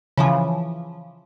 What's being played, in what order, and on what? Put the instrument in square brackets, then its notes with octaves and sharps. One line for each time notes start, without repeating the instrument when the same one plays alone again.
[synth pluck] C#3 E3 F3